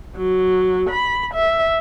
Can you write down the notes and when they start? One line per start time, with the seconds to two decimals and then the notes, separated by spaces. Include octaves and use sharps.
0.16 F#3
0.90 B5
1.34 E5